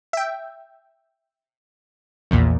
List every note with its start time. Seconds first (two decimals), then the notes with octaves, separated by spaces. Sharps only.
0.13 E5 G5
2.31 A#1 E2 A#2